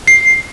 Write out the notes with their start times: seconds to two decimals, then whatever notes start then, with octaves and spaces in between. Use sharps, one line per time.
0.08 C7